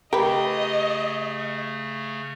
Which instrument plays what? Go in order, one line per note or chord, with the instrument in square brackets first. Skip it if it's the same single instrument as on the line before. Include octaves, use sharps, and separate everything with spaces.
[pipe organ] C#3 A3 [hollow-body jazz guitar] G4 [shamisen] A#4 B4 [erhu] D#5